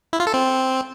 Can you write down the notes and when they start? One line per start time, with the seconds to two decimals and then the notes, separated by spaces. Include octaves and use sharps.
0.13 E4
0.20 F4
0.27 A4
0.34 C4